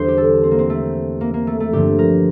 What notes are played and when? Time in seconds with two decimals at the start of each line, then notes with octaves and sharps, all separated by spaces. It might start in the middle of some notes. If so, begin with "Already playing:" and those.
Already playing: E2 D3 G3 C5
0.08 G4
0.18 A4
0.43 C4
0.51 A#3
0.59 C4
0.70 A3
1.21 A#3
1.34 A#3
1.47 A3
1.60 A3
1.73 G2 D3 F3 G4
1.99 A#4